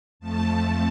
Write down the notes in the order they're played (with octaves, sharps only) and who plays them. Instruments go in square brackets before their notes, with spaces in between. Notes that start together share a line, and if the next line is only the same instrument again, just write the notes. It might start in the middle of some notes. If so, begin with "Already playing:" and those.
[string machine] F2 F3 A3 A5